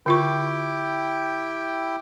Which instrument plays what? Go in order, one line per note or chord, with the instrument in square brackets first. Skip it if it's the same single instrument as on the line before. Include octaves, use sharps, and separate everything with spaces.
[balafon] D3 F4 C#6 [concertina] E4 G4 G5